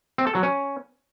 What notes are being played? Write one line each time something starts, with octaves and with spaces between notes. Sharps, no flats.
C4
A4
F#3
C#4